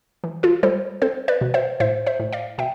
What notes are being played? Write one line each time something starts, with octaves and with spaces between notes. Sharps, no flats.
E3
F4 A4
G3 A4 C5
C4 A4 C5
B4 D5
B2
C5 E5
A2 C5 E5
C5 E5
A2
D5 F5
B2 E5 G5